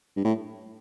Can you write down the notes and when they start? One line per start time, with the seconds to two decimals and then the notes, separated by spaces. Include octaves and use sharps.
0.16 G2
0.25 A2